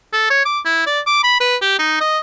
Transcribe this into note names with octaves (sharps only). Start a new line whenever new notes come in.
A4
C#5
D6
E4
D5
D6
B5
B4
G4
D#4
D#5